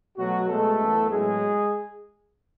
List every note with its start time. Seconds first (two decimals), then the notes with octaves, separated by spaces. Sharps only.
0.17 B2 F#3 A3 F#4
0.48 B2 G#3 A3 B3 A4
0.80 F#2 E3 B3
1.10 A2 F#3 G#3 B3 G#4